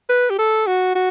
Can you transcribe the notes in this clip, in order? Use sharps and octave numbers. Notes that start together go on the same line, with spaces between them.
B4
G4
A4
F#4
F#4